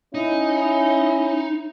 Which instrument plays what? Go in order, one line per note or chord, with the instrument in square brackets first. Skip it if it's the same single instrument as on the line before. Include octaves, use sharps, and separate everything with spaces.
[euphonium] C#4 [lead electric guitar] D#4 [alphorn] E4